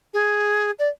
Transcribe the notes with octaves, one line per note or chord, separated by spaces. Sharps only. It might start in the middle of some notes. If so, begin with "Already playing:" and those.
G#4
D5